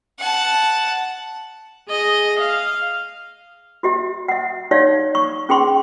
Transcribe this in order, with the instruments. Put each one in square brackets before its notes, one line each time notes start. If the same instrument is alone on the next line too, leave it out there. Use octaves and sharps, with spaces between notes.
[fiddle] F#5 A5
[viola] G#4 D#5
F5
[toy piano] F#4 G4 E5
E5 F#5
D#4 G4 C#5 D5 F5
C#6
C#4 G#4 G5 C6 C#6